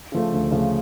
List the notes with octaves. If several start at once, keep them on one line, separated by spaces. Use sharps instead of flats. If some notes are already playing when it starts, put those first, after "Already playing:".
C#3 F3 A3
D2
C#3 F3 A3